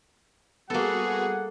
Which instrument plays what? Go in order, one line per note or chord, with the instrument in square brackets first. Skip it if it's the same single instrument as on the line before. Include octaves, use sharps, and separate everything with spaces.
[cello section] G3 G#4 [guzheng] A#3 A4 [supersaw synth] B3 F#4 [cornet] F#5